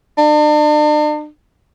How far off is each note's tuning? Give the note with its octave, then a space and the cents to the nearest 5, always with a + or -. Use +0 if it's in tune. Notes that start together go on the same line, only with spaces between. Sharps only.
D4 +40